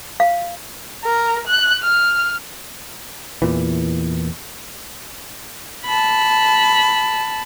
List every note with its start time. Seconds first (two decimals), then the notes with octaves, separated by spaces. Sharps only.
0.20 F5
1.04 A#4
1.47 F#6
1.83 F6
3.42 E2 A#2 E3
5.86 A5 B5